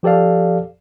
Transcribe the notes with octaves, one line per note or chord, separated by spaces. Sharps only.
F3 G4 A4 D5 F5